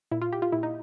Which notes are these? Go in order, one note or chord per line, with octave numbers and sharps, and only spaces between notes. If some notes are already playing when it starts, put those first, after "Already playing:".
A#2 E4
F4
G4
F4
A#2 E4
D#4